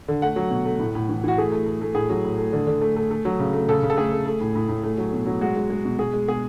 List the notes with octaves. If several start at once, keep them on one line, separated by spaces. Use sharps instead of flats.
D3
A3 F#5
F#3
B2
A3
A2
A2
E3
E3 F#4
A3 G#4
A3
A3
A3
A2 G#4
F#3
A2
A3
D3
D3
A3
A3
A3
F#3
C#3
A3
C#3 A4
C#3
A4
A3 G#4
A3
A3
A2
A2
A2
A3
F#3
B2
F#3
G#3 F#4
G#3
G#3
B2
B2 G#4
G#3
B2 G#4